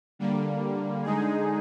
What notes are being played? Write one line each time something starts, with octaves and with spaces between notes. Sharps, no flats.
D3 G3 A#3
D3 G#3 D#4 G#4